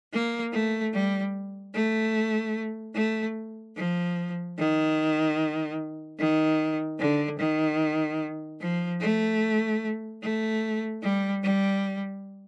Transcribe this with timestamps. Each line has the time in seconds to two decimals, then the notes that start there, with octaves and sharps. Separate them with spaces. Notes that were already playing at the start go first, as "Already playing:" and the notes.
0.12 A#3
0.53 A3
0.93 G3
1.74 A3
2.94 A3
3.75 F3
4.57 D#3
6.17 D#3
6.99 D3
7.38 D#3
8.60 F3
9.00 A3
10.21 A3
11.02 G3
11.42 G3